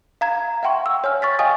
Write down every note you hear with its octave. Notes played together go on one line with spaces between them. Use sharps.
F5 A#5 G#6
E5 F#5 G5 C6 C#6
E6
C#5 G#5 F6
C#6 A6 B6
D#5 F5 G5 G#5 D#6